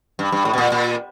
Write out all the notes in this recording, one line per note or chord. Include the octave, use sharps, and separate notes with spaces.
G2
G2
A2
B2
A#2
A#2